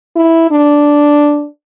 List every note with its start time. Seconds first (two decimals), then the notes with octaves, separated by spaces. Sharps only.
0.16 E4
0.51 D4